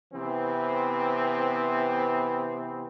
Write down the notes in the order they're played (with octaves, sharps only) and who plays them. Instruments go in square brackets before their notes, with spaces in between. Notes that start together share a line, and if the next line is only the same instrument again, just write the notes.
[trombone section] C3 E3 B3 C4